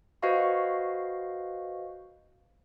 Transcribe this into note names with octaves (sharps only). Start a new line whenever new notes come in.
F#4 B4 C5 D#5 F5 C#6